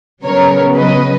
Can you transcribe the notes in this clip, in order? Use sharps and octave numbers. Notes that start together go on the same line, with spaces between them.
C#3 F#3 B3 A#4 C#5
B4 D#5